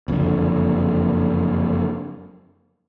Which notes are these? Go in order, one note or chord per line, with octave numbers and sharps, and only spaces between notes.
F#1 F2 G#2 D3